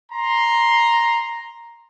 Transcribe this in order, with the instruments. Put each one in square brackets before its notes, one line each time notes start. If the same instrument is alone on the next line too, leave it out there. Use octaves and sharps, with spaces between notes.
[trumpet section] A#5 [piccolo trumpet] C6